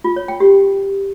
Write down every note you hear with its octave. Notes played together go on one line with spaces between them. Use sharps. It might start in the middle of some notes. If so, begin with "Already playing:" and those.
F4
C#5
G5
G4